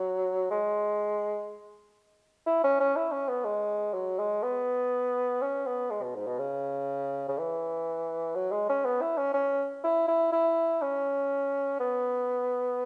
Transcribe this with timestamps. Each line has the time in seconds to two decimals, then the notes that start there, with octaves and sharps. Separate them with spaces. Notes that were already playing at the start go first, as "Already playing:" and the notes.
Already playing: F#3
0.51 G#3
2.46 E4
2.64 C#4
2.80 C#4
2.96 E4
3.12 C#4
3.28 B3
3.45 G#3
3.94 F#3
4.19 G#3
4.43 B3
5.42 C#4
5.66 B3
5.91 G#3
6.02 B2
6.15 G#2
6.27 B2
6.39 C#3
7.28 C#3
7.38 E3
8.35 F#3
8.52 G#3
8.69 C#4
8.85 B3
9.01 E4
9.18 C#4
9.34 C#4
9.84 E4
10.08 E4
10.32 E4
10.82 C#4
11.80 B3